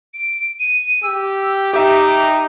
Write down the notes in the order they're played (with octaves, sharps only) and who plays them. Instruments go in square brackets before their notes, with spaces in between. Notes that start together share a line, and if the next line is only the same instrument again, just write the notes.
[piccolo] D7
D#7
[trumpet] G4 [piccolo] E6
[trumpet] D#4 [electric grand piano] G4 E5 [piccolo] D6